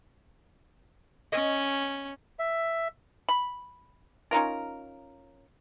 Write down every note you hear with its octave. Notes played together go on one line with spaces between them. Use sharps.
C#4 D#5
E5
B5
C#4 D#4 F4 A#4